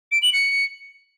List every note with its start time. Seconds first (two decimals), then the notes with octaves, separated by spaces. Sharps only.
0.12 D7
0.22 F#7
0.33 C#7